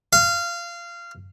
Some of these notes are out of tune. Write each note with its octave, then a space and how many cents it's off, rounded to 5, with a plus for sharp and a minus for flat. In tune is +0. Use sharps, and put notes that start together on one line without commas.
F5 -20